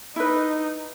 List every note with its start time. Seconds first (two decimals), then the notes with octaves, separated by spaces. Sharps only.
0.16 D#4 E4 B4